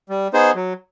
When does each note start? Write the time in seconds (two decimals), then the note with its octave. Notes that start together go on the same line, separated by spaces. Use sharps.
0.09 G3
0.33 B3 D#4 G#4 C5
0.55 F#3